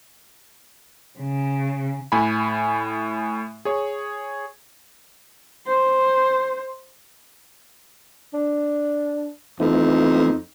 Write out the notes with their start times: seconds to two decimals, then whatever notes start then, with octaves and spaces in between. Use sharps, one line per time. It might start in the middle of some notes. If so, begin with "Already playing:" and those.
1.19 C#3
2.12 A2 G#5 B5
3.65 G#4 C#5
5.67 C5
8.34 D4
9.60 F2 E3 A3 B3 D#4